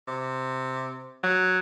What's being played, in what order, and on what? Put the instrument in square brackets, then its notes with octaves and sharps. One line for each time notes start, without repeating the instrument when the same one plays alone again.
[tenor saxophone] C3
[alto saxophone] F#3